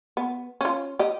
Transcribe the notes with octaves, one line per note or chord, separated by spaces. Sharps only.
B3
C#4 F4
G4 D#5